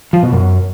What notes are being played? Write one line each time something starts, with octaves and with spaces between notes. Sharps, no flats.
F3
B2
F#2